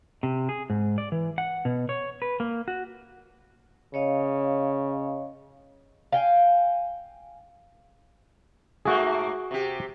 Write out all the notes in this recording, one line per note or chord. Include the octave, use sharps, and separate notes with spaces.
C3
G#4
G#2
D5
E3
F#5
B2
C#5
B4
A#3
F#4
C#3 C#5 D#5 F5
F5 G5 G#5
G#2 A3 A#3 F#4 G#4
C3 G4